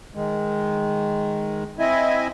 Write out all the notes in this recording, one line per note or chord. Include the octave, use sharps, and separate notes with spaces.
D#3 G#3
C4 E4 D#5 E5 G#5